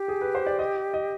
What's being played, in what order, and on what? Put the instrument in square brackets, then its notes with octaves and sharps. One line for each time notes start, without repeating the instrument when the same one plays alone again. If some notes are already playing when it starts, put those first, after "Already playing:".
Already playing: [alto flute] G4
[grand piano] G#4
B4
C5
D5
D#5
D#5